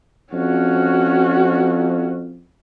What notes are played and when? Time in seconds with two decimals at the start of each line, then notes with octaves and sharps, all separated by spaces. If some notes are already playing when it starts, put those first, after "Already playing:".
0.33 F2 C#4 F#4